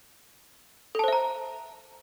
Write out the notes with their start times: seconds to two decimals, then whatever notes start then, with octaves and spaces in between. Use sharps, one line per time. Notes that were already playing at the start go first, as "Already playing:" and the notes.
0.95 A4
0.99 A5
1.04 C5
1.08 E5
1.13 A#5